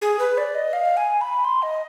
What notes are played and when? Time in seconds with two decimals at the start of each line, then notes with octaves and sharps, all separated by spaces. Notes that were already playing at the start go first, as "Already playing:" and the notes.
0.02 G#4
0.19 B4
0.38 D5
0.55 D#5
0.73 F5
0.97 G#5
1.21 B5
1.45 C6
1.62 D#5